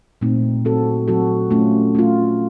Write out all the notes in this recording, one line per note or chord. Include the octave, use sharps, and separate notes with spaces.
A#2 A3 C4 D#4
F#3 C4 F#4 A4
F#3 C4 F#4 A4
A3 C#4 F4
A3 C#4 F4